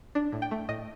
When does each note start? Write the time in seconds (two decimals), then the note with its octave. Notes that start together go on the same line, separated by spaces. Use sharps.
0.15 D4
0.32 A2
0.42 G5
0.51 A3
0.69 A2 D#5